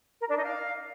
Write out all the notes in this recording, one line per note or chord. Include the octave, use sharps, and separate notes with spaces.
A#4
D4
D#4
F5